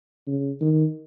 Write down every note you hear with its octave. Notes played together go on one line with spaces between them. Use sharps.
C#3
D#3